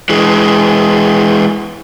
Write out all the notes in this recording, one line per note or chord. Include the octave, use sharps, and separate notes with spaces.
E3 G#3